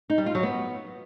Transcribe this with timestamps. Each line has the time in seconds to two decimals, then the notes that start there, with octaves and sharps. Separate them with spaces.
0.10 D#4
0.18 G3
0.26 F4
0.35 F#3
0.43 B3